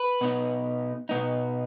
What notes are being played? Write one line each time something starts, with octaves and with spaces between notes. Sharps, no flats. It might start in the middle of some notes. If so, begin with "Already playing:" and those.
Already playing: B4
B2 B3 D#4
B2 B3 D#4